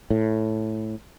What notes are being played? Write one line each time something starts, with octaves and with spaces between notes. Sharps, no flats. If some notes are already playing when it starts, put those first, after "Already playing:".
A2